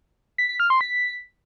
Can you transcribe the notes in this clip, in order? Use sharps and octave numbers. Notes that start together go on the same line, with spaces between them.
B6
B6
F6
C6
B6